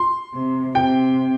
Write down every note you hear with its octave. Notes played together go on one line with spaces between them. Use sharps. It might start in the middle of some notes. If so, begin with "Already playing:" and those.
Already playing: C6
C3
C3 G5